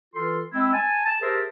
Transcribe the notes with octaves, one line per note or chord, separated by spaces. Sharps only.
E3 F4 A4 C6
G#3 C4 E4
G#5 A5
A5
G4 G#4 A#4 C5 E5 A5